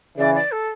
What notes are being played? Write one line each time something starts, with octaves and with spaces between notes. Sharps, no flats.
C#3 E3 D5
D5
A4